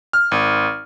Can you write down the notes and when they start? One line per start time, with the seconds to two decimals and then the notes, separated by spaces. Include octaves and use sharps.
0.13 F6
0.31 G#1